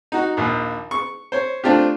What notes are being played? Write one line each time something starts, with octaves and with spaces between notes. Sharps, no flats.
D#4 F#4
A#1 D#2
C#6
C5 C#5
A3 C4 D4 F4 G4